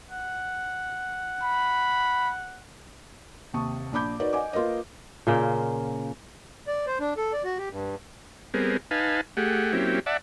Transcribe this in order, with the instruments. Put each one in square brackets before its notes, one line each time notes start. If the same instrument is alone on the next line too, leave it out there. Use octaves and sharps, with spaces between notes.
[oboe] F#5
[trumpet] B5
[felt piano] D#2 C3 A5 C#6 D#6
A#1 D4 B5 D6 G6
D#4 F#4 A#4 B4 D5
D#5 F#5 G#5 D6
A#3 F4 A#4 B4 D#5
[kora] A#2 C#3 A#3 C5
[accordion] D5
C5
D4
A4
D5
F#4
G4
G2
[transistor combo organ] G3 B3 C4 G#4 A#4
D#4 B4 F5 G#5 A5
A3 G4 G#4 F#5
F#3 A#3 C4 C#4 E4 G4
D5 E5 F#5 A5